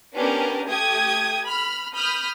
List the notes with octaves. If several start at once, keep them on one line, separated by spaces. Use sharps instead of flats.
B3 C#4 D4 G4 A#4 B4
A3 G4 G5 D#6 G#6
B5 F6
B5 D#6 F6 G6